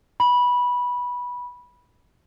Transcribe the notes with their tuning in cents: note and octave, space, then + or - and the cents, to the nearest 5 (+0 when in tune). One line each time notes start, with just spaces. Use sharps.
B5 -15